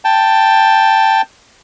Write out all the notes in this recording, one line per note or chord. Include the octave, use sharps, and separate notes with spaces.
G5 A5